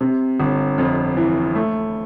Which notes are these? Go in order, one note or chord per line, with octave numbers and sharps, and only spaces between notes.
C3
G1
F2
E3
A3